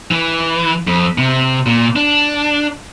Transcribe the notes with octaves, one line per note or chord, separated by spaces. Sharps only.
E3
F2
C3
A#2
D4